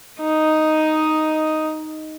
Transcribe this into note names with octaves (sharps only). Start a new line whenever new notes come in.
D#4 D#5